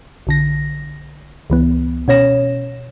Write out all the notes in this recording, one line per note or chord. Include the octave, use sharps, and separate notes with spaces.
B1 D3 A#6
C#2 E3 B3
B2 C#4 C#5 A#6 E7